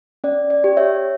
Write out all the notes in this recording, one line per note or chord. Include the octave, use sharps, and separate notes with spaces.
C#4 D5
D5
G4
C#5 E5